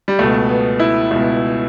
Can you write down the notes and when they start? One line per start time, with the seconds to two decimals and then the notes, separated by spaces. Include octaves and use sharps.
0.08 G3
0.19 C#2 B2 A3
0.49 B3
0.80 E4
1.11 C#2 B2